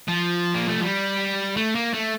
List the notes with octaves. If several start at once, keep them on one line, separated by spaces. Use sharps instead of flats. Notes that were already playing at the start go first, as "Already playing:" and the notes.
F3
A#3
A3
G3
A3
A#3
A3